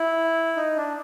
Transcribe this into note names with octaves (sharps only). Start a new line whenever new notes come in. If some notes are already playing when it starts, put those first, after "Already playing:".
Already playing: E4
D#4
D4